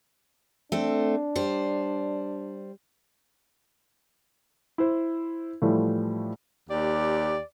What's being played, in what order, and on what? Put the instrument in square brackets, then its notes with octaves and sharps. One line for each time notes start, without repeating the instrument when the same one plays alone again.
[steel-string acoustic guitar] A3 C4 [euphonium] D4
[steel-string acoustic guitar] G3 C5
[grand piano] E4 C5
A2 E3 F3 G3 A3
[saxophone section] D#2 G4 D5